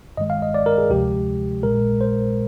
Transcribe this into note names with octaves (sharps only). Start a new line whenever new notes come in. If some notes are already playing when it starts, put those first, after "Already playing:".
G1 G2 D#3 G#3 D#5
F5
D#5
D5
A#4
G#4
D2 C3 F3 G#3 G4
A#1 A#2 G#3 A#4
C5